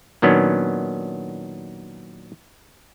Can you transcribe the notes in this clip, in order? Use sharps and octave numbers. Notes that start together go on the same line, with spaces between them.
A#2 D#3 F#3 B3 C#4 D4